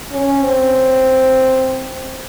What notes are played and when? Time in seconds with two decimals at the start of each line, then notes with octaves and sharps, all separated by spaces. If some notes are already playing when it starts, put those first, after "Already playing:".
0.13 C#4
0.42 C4